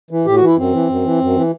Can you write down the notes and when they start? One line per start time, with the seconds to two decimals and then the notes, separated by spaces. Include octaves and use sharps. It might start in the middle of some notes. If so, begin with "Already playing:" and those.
0.11 E3
0.25 A2 G4
0.36 F#4
0.41 E3 E4
0.57 F#2 C4
0.72 E3
0.89 F#2
1.04 E3
1.21 F#2
1.36 E3